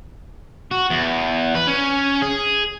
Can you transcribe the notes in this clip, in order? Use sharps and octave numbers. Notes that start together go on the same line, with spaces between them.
F#4
E2
B4
C#4
G#4